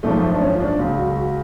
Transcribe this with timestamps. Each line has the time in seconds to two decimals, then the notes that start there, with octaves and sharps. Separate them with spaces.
0.03 G#1 F#2 F3 A3
0.32 D4
0.41 C#4
0.55 F4
0.60 D4
0.79 C#2 C#3 F#3 F#4
0.98 F#4
1.08 G#4
1.16 F#4